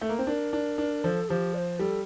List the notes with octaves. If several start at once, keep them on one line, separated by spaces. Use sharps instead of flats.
A3
A#3
C4
D4 A#4
D4
D4
F3 A4
F3 G4
D5
C5
G3 A4